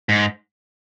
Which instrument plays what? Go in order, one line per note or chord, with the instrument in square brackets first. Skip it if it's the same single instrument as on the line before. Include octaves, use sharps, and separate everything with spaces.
[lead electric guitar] G#2